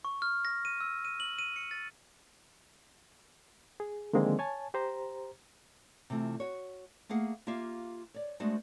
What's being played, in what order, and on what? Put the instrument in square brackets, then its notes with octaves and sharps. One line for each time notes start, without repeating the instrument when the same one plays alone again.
[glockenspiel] C#6
F6
A#6
D#7
E6
D#7
F#7
D#7
C#7
A6
[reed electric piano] G#4
D3 D#3 F3 G#3 A#3 C4
C#5 G#5 A5
G4 C5 A#5
[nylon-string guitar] C3 E3 A3 F4
F#4 C#5
A3 A#3 G#4 F5 F#5
A#3 F4 G4 E5 F5
C#5 D5
G#3 A3 B3 D4 F#4 C5